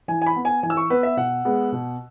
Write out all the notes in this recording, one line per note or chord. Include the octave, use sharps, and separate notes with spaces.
E3 G#5
G#5
B5
B3
G#5
E3 G#5
E6
C#6
B3 B4
E5
B2 F#5
G#3 B3
B2